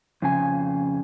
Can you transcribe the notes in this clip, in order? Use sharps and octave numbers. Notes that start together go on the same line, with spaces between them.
F2 C#3 G#5